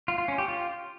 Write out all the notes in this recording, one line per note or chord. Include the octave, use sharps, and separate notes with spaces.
F4
F4
C#4
G4
F4